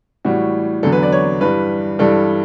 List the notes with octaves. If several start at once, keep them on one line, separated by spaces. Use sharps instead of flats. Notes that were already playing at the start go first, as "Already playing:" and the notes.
A2 E3 G3 F#4
E2 D3 F#3 A4
B4
D5
C#5
G2 E3 G3 B4
G2 E3 G3 A4